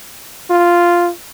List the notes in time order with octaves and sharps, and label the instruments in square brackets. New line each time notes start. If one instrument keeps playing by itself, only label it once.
[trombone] F4